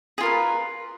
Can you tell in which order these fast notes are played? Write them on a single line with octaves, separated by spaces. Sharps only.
G#4 F4 A#4 B4